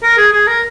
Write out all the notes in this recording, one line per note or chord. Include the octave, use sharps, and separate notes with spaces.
A#4
G#4
G#4
A#4